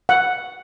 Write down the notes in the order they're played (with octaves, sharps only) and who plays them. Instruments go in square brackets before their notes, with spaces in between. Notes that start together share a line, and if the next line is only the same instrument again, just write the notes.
[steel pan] F#5